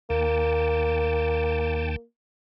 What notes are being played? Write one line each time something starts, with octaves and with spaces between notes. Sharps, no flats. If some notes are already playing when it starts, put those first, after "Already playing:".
D#2 A#3 G5 A5